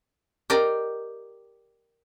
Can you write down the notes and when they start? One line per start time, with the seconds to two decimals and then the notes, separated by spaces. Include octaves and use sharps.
0.50 G4 A#4 D5 D#5